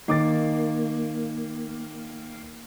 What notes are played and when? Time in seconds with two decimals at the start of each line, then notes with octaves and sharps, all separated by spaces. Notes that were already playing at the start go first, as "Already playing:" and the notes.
0.08 D#3 A#3 D6 A6